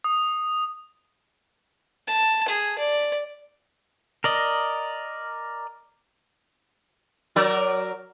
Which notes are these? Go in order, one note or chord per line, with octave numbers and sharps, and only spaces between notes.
D#6
A5
G#4
D5
A#4 D5 D#5
F#3 A#4 D5